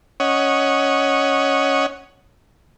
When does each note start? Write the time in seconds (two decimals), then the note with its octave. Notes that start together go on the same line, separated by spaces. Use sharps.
0.20 C#4 C#5 D#5 F#5